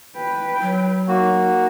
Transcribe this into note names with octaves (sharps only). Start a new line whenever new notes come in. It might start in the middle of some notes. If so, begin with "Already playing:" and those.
B4 G5
F#3
A#3 D#4 F#4